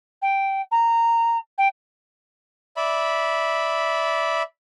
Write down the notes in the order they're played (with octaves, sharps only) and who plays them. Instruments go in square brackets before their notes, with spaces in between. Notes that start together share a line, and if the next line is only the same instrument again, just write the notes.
[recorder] G5
A#5
G5
[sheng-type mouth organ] D5 E5 B5